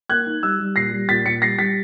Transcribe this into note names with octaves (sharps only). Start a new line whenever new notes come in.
A#3 F#6 G#6
D#4
G3 E6 F#6
G3
A#2 A#6 C7
G3
A#2 A6 B6
A#2 B6 C#7
G3 A#6 C7
G3 A6 B6